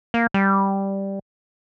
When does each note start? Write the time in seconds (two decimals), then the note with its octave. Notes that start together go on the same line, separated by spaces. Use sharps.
0.14 A#3
0.34 G3